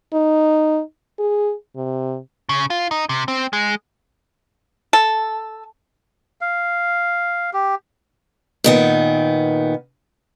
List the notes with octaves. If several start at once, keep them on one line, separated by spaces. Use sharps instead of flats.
D#4
G#4
C3
C#3
F4
D#4
C3
C4
G#3
A4
F5
G4
A#2 D#3 B3